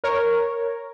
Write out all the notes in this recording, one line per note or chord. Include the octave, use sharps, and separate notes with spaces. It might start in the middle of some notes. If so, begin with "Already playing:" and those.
A#4 C#5